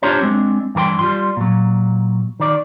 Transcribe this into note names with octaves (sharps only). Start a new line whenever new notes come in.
D4 F4 G4 C5 C#5 A#5
G#3 A3 C4 D4
G2 E3 A#4 G5 C6
G3 F4 C6
A#2 F#3
D#3 D5